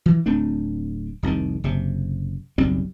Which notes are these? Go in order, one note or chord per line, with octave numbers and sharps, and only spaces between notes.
E3
D1 A3 C4 D4
F1 C2 C3 D#3
F#1 C3
F#1 B1 G3 C4